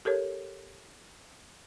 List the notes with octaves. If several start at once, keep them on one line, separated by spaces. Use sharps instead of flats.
G4 A4 A#4 C#5